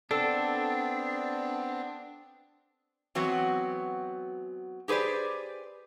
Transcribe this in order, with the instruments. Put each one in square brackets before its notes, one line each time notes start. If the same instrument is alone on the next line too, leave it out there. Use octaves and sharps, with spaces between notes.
[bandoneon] B3 C4 [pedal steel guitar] D4 [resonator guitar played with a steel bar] A4
[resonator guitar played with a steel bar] E3 F#3 B3 C4 F#4
G4 G#4 B4 C5 D5